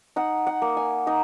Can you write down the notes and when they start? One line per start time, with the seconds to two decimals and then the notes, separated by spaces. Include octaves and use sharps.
0.16 D#4 F#5
0.47 F#5
0.62 A#3
0.77 G#5
1.07 D#4 A#5